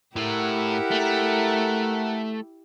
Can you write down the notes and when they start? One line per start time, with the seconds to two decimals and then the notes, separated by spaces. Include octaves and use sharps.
0.16 A2 E4 G4 A#4 F#5
0.91 A3